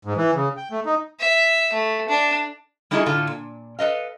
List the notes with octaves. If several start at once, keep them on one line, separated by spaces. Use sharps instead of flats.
G#2
E3
C#3
G5
A3
D#4
E5
A3
D4
G3 A3 D#4 E4 F#4 G#4
A2 D3 F4 A4
A#2
A4 B4 D#5 F5